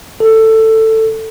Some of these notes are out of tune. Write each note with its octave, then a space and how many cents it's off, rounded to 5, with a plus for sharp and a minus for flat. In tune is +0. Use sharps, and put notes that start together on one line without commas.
A4 +15